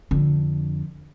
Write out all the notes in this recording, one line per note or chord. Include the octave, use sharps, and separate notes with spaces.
F2 D3